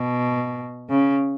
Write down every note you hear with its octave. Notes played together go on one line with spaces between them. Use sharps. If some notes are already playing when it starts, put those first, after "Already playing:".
Already playing: B2
C#3